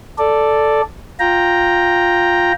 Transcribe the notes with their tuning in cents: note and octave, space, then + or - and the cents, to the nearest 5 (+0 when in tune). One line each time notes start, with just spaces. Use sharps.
A4 +0 D5 +0
F4 +10 G5 +0 A#5 +0